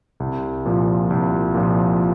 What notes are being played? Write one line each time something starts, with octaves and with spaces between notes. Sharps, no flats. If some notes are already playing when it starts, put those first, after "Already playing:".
C2
A#2 F3
C2
A#2 F3